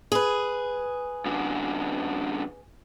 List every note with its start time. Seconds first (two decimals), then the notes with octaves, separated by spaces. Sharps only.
0.12 G#4 B4
1.26 F#2 D3